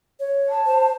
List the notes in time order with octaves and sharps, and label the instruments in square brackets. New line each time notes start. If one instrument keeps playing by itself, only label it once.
[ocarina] C#5
[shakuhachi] A5
[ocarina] C5